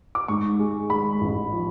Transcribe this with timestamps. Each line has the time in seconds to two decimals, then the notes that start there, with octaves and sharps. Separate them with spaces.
0.15 D6
0.28 G#2 C#6
0.59 G#3
0.90 G#3 B5
1.21 A1
1.52 F3